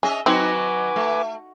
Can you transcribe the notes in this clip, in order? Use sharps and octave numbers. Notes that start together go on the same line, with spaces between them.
C#4 G#4 D#5 E5
F#3 C4 D#4 F#4 B4 G#5 D6
A3